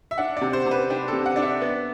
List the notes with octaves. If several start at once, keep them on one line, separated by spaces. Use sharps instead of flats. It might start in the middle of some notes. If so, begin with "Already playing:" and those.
E5
D4 F#5
C3 D5
C5
C3 B4
D4 G4
C3 A4
F#5
D4 D5
E5
B3